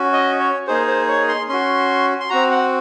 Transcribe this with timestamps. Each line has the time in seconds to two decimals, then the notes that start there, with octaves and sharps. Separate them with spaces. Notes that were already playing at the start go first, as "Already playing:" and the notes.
Already playing: C#4 F#4
0.13 D#5
0.39 C#5
0.67 A#3 D#4 G#4 C5
0.87 C5
1.08 C#5
1.28 C6
1.48 C#4 F#4 C6
2.20 C6
2.30 C4 F#4 A#5
2.51 F#5